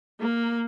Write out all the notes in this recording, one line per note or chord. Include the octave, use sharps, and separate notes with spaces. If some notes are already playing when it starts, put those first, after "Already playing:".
A#3